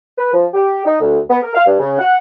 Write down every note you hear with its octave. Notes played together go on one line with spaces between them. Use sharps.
B4
F3
G4
D#4
D2
B3
A#4
F5
G2
C#3
F#5